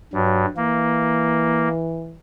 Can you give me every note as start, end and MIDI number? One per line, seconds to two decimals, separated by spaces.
0.13 0.45 43
0.13 0.48 54
0.56 2.18 52
0.56 1.68 58